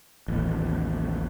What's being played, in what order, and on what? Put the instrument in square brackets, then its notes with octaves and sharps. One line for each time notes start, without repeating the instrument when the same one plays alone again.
[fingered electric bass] A1 D#2